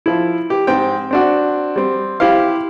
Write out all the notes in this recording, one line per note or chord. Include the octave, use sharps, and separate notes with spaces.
F3 E4
G4
G#2 C4 G5
C4 D4 F#4
G3 C4
E4 G4 C5 F5